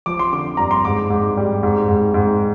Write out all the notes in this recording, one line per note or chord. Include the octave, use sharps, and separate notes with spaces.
F3 D6
C6
D3 D6
G2 A#5
C6
G#2 D6
G#2
G3
G#2
G#2
G#2